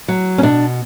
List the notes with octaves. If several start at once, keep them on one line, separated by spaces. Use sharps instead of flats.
F#3
C#4
B2 D4